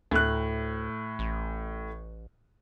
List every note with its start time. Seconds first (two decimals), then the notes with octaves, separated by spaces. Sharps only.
0.11 D2 A2 F#6
1.19 A1